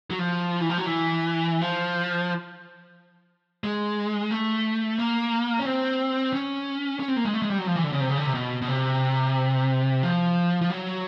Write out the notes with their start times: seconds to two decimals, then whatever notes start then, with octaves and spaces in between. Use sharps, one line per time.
0.10 F#3
0.19 F3
0.60 E3
0.69 F3
0.78 F#3
0.86 E3
1.61 F3
3.64 G#3
4.31 A3
4.98 A#3
5.59 C#4
5.65 C4
6.33 C#4
7.00 C#4
7.08 C4
7.16 A#3
7.25 G#3
7.34 A3
7.42 G#3
7.50 G3
7.58 F#3
7.67 F3
7.76 E3
7.84 D3
7.92 C#3
8.00 C3
8.09 C#3
8.18 D3
8.26 C3
8.34 B2
8.62 B2
8.68 C3
10.03 F3
10.61 F3
10.70 F#3